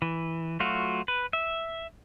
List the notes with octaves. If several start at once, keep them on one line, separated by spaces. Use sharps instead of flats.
E3
F#3 A3 F4 F#4
B4
E5